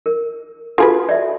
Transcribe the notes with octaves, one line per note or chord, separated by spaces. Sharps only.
A#4
F4 F#4 G#4 A4 B4
D5 E5